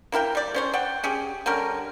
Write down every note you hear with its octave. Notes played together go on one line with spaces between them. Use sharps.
A#3 E4 A#4 G5
G3 D5
C#4 C5 C#5
D5 F#5 G5
C#4 G4 G#4
D3 G3 C#4 A#4